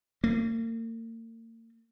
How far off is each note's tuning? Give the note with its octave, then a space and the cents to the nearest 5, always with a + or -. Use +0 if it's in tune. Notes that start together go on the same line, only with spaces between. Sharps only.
A#3 -40